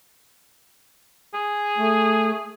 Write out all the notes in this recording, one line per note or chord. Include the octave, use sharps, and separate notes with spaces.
G#4
A3